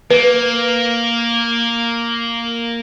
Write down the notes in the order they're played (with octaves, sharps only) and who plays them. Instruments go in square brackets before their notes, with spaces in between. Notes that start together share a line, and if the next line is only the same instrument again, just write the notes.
[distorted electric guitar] A#3 [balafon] B4